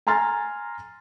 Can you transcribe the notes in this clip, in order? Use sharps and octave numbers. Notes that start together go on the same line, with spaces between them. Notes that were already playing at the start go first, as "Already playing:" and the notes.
G#5 A#5 C6 F6 A6